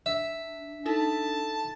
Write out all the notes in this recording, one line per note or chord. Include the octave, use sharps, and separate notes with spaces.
D4 E5
D#4 E4 A4 A5